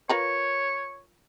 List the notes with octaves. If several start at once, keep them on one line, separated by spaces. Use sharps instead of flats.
F4 A#4 B4 C#5